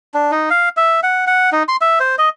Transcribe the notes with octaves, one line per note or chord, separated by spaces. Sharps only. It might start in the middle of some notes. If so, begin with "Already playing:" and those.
D4
D#4
F5
E5
F#5
F#5
D#4
C6
E5
C5
D#5